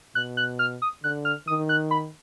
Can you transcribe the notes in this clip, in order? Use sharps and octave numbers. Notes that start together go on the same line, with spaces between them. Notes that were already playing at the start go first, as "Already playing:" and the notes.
B2 F#6
F#6
F6
D#6
D3 F#6
F6
D#3 D#6
F#6
B5